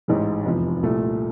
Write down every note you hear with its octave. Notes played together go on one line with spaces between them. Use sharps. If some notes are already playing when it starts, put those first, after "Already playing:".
A1 G#2 E3 G#3
F1 E2 C3 F3
C2 A#2 F3 A3